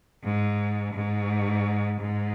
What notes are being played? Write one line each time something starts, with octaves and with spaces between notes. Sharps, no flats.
G#2
G#2
G#2